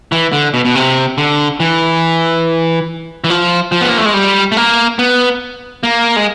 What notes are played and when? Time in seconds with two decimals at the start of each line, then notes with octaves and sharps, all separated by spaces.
0.12 E3
0.32 D3
0.54 B2
0.65 B2
0.75 C3
1.18 D3
1.60 E3
3.24 E3
3.30 F3
3.72 F3
3.81 B3
3.89 A#3
3.98 A3
4.05 G#3
4.14 G3
4.52 A3
4.57 A#3
4.99 B3
5.83 A#3
6.16 G#3